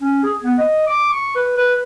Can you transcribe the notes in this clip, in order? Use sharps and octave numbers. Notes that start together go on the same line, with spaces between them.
C#4
G#4
B3
D#5
D6
C#6
B4
B4